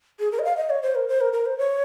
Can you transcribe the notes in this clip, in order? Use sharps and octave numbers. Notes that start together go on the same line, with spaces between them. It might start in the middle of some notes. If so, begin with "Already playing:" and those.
G#4
A#4
D#5
F5
D#5
C#5
C5
A#4
C5
A#4
A#4
C5
C#5